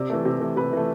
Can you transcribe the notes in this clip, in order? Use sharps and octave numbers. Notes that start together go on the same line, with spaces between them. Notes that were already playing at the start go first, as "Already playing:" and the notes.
Already playing: C3 D5
E3 A3
C3
E3 A3
C3 B4
E3 A3